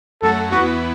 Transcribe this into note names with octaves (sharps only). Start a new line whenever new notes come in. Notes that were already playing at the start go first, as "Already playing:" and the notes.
F#2 F#3 A3 F#4 A4
E2 E3 B3 E4 F#4 B4